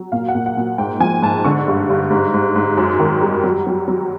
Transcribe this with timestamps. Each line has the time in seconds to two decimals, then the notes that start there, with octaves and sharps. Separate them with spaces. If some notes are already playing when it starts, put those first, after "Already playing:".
Already playing: F#3
0.12 A#2 F5
0.28 F#5
0.35 A#2
0.46 F#5
0.57 A#2
0.78 G#2 G5
1.00 F3 G#5
1.22 G#2 A5
1.44 D3 C#6
1.68 G2
1.90 G2
2.11 G#2
2.34 G#2
2.56 G#2
2.77 F#2
3.00 D#3
3.22 G3
3.44 F#3
3.67 F#3
3.88 F#3